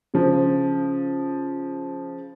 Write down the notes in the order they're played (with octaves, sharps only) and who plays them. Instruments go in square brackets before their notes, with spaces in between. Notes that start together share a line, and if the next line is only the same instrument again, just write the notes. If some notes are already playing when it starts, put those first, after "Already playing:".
[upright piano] C#3 F3